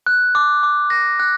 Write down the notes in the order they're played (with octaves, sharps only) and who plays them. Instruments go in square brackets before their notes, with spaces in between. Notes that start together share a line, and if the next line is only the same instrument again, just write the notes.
[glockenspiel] F#6
D6
D6
A#6
F#6